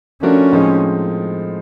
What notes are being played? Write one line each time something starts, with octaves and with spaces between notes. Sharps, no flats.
F3 A3 C#4 D4 F#4 A#4
A2 F3 G#3 C4 D#4